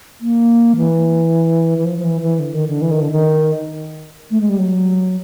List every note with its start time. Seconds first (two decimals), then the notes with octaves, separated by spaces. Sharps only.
0.21 A#3
0.76 E3
1.78 E3
1.85 F3
1.98 F3
2.04 E3
2.21 E3
2.39 D3
2.53 D#3
2.68 D3
2.81 E3
2.91 D#3
3.01 D3
3.11 D#3
4.31 A3
4.41 G#3
4.49 G3
4.59 F#3